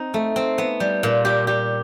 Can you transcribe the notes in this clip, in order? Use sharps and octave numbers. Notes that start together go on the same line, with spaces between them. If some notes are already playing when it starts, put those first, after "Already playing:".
Already playing: C4 D#4
A3
C4
B3
G3
A#2
G4
G4